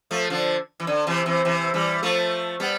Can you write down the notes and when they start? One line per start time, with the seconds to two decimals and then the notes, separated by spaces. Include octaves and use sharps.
0.11 F3 A3
0.30 D3 F3
0.80 E3
0.87 D3
1.07 C3 E3
1.26 C3 E3
1.45 C3 E3
1.74 E3 G3
2.03 F3 A3
2.60 G3 B3